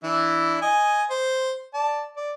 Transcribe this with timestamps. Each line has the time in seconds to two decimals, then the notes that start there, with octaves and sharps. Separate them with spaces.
0.04 E3 D4 E4
0.62 D#5 G#5
1.10 C5
1.74 D5 A5
2.17 D5